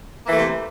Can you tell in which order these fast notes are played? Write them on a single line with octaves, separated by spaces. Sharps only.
A#3 E3 A3 C3